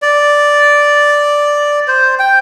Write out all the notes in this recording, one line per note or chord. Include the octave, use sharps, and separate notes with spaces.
D5
C5
G5